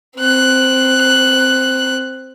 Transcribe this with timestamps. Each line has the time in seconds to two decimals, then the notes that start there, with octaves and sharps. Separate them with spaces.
0.16 C4 F#6